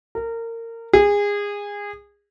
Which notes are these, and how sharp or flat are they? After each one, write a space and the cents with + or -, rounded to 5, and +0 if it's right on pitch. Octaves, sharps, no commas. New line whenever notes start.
A#4 -25
G#4 -25